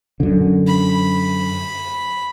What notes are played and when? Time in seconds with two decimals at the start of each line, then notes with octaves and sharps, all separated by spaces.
0.20 F#2 D3
0.67 B5